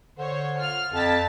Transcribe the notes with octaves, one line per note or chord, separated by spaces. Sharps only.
D3 C5 C#5
F4 F6
F2 A5 A6 B6